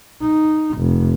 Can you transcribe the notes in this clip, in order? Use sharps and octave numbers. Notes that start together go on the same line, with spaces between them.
D#4
F1